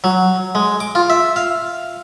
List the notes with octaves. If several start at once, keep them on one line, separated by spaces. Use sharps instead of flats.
F#3
G#3
D6
F4
E5
F5